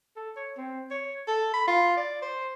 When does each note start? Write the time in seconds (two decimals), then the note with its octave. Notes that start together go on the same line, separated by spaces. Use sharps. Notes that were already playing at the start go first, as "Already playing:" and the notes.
0.16 A4
0.36 C#5
0.57 C4
0.91 C#5
1.28 A4
1.53 B5
1.67 F4
1.97 D5
2.22 C5